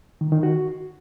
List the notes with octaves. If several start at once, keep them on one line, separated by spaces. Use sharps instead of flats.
D#3
D#3
F#4